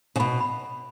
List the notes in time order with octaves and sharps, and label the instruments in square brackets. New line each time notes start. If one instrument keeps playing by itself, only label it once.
[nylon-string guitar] C#3
[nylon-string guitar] B2 [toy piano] B5
[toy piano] B5